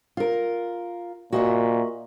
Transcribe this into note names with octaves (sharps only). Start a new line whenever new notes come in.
F4 A#4
A#2 F#4 D#5 E5